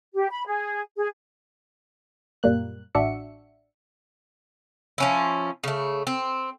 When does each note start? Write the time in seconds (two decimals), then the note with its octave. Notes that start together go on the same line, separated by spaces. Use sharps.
0.14 G4
0.30 B5
0.47 G#4
0.97 G#4
2.43 F#2 A#2 G3 A#3 F#6
2.95 A1 D4 F#4 E5 C#7
4.98 F3 C#4 E4
5.64 C#3 A3
6.07 C4